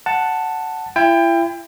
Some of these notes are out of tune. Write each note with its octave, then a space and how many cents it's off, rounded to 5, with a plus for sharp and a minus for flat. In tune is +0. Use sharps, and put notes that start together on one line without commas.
F#5 +0 A5 +5
E4 +35 G5 +25